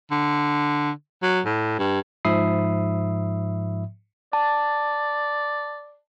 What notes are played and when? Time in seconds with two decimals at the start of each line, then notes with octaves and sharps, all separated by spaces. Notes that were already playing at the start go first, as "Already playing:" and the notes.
0.11 D3
1.23 F#3
1.46 A2
1.79 G2
2.25 G#2 F3 E5 B5 D#6 C7
4.33 D5 A5